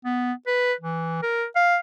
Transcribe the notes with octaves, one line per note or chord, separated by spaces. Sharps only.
B3
B4
E3
A#4
F5